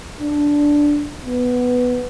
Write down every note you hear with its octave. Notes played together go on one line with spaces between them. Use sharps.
D4
B3